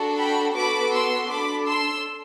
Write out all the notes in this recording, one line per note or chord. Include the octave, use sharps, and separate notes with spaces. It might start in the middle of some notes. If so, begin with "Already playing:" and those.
Already playing: D4 F#4 A4
G5 B5
B3 F#4 A4 B5 D6
C6 E6
D4 A4 B5 D6
C6 E6